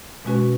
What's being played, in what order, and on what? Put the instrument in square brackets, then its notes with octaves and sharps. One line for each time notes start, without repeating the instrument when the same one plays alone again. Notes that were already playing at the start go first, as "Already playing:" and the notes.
[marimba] B2 G#3 C#4 F#4 B4